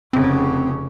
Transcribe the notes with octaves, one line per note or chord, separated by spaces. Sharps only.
F1 C#3 C4